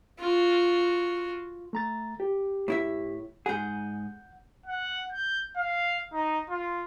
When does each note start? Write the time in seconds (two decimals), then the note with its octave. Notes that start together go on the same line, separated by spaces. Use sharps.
0.20 F4 F#4
1.73 A3 A#5 A6
2.20 G4
2.68 A2 E4 E5
3.46 G#2 G#4 F#5 G6
4.66 F#5
5.12 G6
5.57 F5
6.13 D#4
6.50 F4